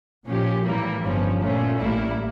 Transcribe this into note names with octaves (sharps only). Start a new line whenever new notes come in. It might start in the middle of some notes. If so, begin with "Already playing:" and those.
A#2 F3 C#4 G4
A2 E3 G3 A#3
G1 G2 F3 C#4
A#2 A3 C#4
A1 A2 G3 A#3 E4